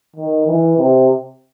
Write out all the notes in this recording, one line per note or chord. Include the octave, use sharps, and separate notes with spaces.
D#3
E3
C3